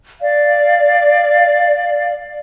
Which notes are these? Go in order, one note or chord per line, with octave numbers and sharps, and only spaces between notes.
D5 F5